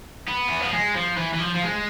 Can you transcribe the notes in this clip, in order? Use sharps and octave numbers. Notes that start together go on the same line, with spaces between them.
B3
E3
F3
G#3
F3
E3
E3
F3
F3
G#3